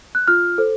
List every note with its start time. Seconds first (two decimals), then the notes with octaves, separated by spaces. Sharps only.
0.15 F#6
0.28 F4 F6
0.58 A4 C5